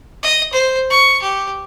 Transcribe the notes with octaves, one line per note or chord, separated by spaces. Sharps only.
D#5
C5
C#6
G4